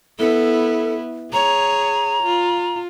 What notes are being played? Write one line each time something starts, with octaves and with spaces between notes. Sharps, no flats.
B3 E4 A4
G#4 C#5 A#5
F4